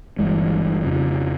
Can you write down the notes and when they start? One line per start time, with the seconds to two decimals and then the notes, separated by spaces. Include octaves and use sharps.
0.19 G1 G2 E3 G#3
0.84 F2 C#3 F3